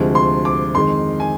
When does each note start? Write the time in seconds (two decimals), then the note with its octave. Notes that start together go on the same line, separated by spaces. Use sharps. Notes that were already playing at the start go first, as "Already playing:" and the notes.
Already playing: D2 C3 F3 G#3
0.15 C6
0.45 D6
0.74 F2 D#3 G#3 C6
1.20 G#5